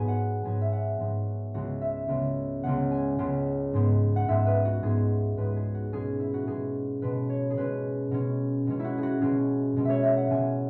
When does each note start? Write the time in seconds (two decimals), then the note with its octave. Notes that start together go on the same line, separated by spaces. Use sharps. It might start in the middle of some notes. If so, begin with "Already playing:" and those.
Already playing: G#2 F#3 B3 F#4 G#4 B4 G#5
0.08 F#5
0.45 G#2 F#3 B3 G#5
0.62 E5
0.72 F#5
1.00 G#2 F#3 B3
1.54 C#2 C#3 G#3 B3 F#4
1.82 E5
2.08 C#2 C#3 G#3 B3
2.63 C#2 C#3 G#3 B3 F#5
2.91 G#5
3.18 C#2 C#3 G#3 B3
3.73 G#2 G#3 B3
4.16 F#5
4.28 G#2 G#3 B3 E5
4.47 B4
4.65 F#4
4.83 G#2 G#3 B3 G#4
5.37 G#2 G#3 B3 B4
5.56 G#4
5.75 F#4
5.92 B2 G#3 C#4 G#4
6.20 E4
6.34 F#4
6.47 B2 G#3 C#4 G#4
7.02 B2 G#3 C#4 B4
7.29 C#5
7.50 G#4
7.57 B2 G#3 C#4 B4
8.11 B2 G#3 C#4
8.67 B2 G#3 C#4
8.79 E4 F#4
8.98 G#4
9.03 F#4
9.21 B2 G#3 C#4 G#4
9.76 B2 G#3 C#4
9.85 C#5 E5
10.03 E5
10.17 F#5
10.31 B2 G#3 C#4 G#5